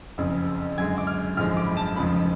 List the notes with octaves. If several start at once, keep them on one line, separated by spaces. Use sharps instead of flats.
F#1 F2 C#3
F#2 D3 G#3 G#6
D6
F6
G#1 F#2 D3 F3 G#3 F6
D6
B5
A5
F1 F2 C#3 F3 G#3 B5